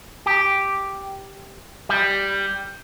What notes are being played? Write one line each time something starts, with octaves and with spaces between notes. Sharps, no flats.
G4
G3